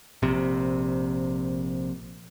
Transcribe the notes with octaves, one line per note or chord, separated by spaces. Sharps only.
A#1 C3